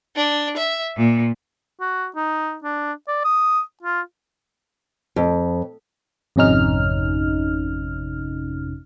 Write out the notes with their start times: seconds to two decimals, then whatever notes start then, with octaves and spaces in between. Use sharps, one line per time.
0.16 D4
0.56 E5
0.97 A#2
1.80 F#4
2.15 D#4
2.64 D4
3.08 D5
3.25 D#6
3.83 F4
5.16 F2
6.36 G#1 F2 C3 C#4 D#4 F6